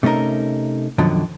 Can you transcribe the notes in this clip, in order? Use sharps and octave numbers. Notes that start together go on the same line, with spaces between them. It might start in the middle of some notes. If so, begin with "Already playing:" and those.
C3 A3 C#4 D#4 A#4
F#2 B2 D3 D#3 F3 F#3